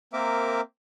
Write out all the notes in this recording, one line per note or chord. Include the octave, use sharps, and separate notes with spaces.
A#3 C4 A#4 E5 D6